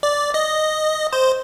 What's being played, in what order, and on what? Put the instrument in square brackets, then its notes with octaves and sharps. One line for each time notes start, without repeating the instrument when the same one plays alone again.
[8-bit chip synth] D5
D#5
C5